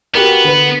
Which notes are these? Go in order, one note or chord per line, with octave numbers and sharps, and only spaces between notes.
B3 F#4 G4 A#4
D3 B4